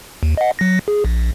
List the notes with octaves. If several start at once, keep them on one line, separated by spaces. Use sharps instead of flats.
D#2
D#5 F#5
F#3 A#6
G#4
A#1